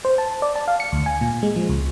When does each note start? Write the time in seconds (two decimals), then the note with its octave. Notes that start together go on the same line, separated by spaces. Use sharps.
0.05 C5
0.18 A5
0.42 D5
0.56 A5
0.68 F5
0.80 C#7
0.92 D2
1.06 G#5
1.21 A#2
1.43 G#3
1.56 F3
1.70 C#2